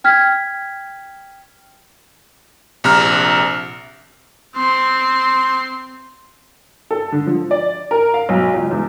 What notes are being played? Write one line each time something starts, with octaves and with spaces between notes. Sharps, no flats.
G5 F6 G#6 B6
A#1 C3 A#5 F6
C4 C6
A4
D3
F3
D5
A#4
F5
B1
C#2
E2